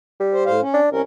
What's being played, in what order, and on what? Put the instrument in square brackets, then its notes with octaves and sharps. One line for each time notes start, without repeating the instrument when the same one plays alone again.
[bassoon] G3
[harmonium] C5
A2 C5 F5
C#4
[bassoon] D4
[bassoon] C2 [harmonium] C#4 A#4